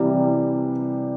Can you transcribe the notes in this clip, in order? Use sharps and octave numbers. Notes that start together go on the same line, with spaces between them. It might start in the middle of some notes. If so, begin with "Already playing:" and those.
Already playing: C3 E3 G3